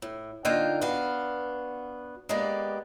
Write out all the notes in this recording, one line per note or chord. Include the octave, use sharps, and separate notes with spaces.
A2
D3 A#3 D#4 F4 G5
B3 D4 F#4 F5
G#3 A#3 B3 G4 D5